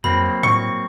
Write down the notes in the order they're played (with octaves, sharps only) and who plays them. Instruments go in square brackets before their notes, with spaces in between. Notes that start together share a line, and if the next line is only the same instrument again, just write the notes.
[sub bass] F2 [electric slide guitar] F#3 A#3 C4 [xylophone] B5
[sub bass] A2 [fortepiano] C#6